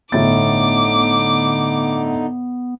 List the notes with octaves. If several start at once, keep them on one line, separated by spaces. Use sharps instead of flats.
G1 A2 D3 B3 D#4 D6 A6